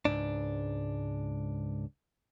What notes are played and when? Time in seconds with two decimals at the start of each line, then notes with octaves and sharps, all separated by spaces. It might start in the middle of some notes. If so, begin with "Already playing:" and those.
0.05 C#2 G#2 D4